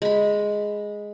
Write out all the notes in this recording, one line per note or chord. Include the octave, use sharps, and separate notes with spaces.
G#3 B5